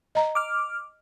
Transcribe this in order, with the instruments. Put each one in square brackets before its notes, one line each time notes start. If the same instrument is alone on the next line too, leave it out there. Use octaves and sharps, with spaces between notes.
[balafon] D#5 A#5
[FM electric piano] D6 F6